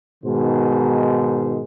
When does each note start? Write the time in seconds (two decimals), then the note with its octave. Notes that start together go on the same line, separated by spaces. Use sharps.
0.24 G#2 B2 D#3 C5